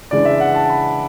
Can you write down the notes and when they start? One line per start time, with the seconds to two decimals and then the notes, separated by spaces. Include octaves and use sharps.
0.11 C#3 E3 G#3 D4 D5
0.25 E5
0.40 F#5
0.55 A5
0.69 B5